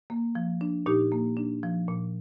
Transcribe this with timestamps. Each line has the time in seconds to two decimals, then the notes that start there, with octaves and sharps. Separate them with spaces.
0.10 A#3
0.35 F3
0.61 D4
0.86 A#2 D#4 G4
1.12 A#3
1.37 D4
1.63 F3
1.89 A#2